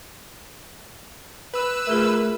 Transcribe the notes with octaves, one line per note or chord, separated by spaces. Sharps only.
B4 E6
A3 F4 G#4 A#4 E5